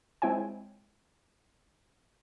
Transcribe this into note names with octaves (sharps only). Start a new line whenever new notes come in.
G#3 C4 E4 C#5 G5 G#5